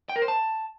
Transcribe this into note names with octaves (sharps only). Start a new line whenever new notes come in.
G5
A#4
C5
A5